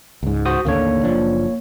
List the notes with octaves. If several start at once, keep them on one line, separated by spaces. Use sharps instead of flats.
C#2 G#2
F#4 C5 D#6
A1 D#2 D3 A#3 C#5
F#1 F3 D4